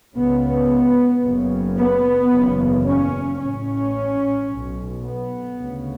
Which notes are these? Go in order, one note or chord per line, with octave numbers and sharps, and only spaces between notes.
C#2 C#3 B3
F#1 F#2 C#3
B3
F#1 E2 C#3
C#4
A1 A2 C#4
B1 B2
B3
D2 C#3